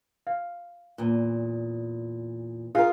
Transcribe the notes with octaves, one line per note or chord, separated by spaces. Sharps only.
F5
E2 A#2
F4 G#4 A#4 F5